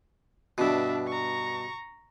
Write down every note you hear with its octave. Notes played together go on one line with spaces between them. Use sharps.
G2 B2 D4 E5
A#5 C#6